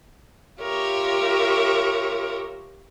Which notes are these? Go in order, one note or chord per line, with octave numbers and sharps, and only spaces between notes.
F4 G4 A#4 C#5 E5